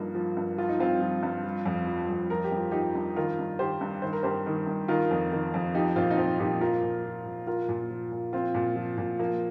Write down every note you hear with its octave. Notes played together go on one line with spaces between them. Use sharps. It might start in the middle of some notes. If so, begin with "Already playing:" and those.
Already playing: G2 F3 A#3 D#4
F3
G2
F3 F4
D#4
G2 C4 F4
F3
G2
F3
F2
F3
F2
F3 A#4
G4
G2
F4
F3 D#4 G4
G2
D#3 F4 A#4
G2
D#3 G4 C5
G2
D#3 C5
A#4
G2 G4 C5
D#3
G2
D#3 F4 A#4
F2
D#3
F2
F3 D#4 G4
A#2 C4 F4
D#4
F3 C4 F4
A#2 D#4 G4
F3 F4 A#4
A#2
F3
A#2
F3 F4 A#4
A#2
F3
A#2
F3 C4 F4
A#2
F3
A#2
F3 A#3